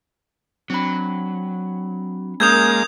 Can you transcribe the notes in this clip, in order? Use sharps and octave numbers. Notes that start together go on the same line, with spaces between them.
F#3 C4 D4 B5
G#3 A#3 C#4 A#4 D#6 E6 G6 G#6